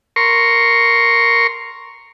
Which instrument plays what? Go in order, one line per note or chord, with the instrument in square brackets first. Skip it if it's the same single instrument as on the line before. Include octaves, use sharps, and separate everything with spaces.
[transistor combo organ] A#4 C6 C#6